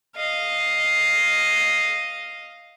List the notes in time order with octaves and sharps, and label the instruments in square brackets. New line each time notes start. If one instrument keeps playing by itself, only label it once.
[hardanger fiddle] D#5 F5